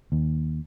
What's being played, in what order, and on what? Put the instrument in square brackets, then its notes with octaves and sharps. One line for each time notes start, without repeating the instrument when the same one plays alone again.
[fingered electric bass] D#2